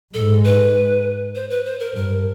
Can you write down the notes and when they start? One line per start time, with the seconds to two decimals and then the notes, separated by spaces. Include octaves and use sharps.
0.14 G#2 A4
0.44 B4
1.35 C5
1.50 B4
1.65 C5
1.80 A#4
1.95 G2 A#4